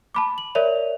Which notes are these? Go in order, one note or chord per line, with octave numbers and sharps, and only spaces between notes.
A5 B5 D6
F#7
A#4 C#5 D5 E5 F7